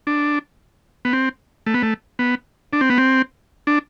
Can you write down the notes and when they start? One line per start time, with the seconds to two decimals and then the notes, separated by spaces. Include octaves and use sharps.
0.07 D4
1.05 B3
1.13 C4
1.66 A3
1.74 B3
1.83 A3
2.19 B3
2.73 D4
2.81 C4
2.90 B3
2.98 C4
3.67 D4